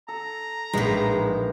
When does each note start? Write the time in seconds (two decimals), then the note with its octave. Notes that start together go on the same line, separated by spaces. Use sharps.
0.08 A4 A#5
0.73 A#1 A2 E3 G#3 D#4 B6